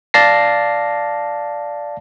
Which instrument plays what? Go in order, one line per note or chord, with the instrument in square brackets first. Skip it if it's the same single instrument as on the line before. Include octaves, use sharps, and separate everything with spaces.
[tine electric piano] D5 F5 A5 A#6 C7